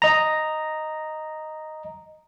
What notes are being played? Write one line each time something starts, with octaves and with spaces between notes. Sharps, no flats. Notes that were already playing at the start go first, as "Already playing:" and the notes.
D#5 A#5